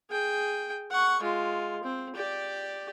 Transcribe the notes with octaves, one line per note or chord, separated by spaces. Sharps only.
G#4 G5
F#5 C#6
G#3 F4
C4
G4 D5